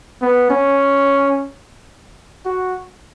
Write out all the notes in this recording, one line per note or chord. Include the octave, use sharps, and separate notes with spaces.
B3
C#4
F#4